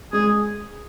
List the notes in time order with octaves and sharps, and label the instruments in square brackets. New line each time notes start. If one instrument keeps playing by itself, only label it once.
[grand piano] G#3 [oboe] G#4